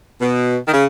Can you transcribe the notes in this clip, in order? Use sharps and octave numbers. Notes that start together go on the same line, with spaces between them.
B2
D#3
C#3